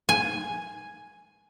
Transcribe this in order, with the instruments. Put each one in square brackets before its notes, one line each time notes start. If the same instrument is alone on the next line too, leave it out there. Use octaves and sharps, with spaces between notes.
[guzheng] G#5